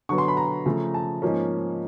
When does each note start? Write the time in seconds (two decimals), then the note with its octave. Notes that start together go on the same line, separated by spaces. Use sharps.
0.09 D3 F#3 B3 C#6
0.18 C6
0.28 B5
0.37 A#5
0.66 C#3 F3 A3
0.94 A5
1.22 G#2 F3 A#3 C#4